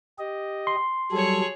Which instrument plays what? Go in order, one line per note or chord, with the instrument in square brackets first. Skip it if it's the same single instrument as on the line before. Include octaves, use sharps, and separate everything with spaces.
[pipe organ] G4 D#5
[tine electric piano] C6
[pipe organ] F#3 G3 A4 [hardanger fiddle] G#4 C#5